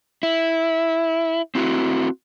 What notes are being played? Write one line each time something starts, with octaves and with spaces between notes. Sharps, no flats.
E4
C4 E4 F#4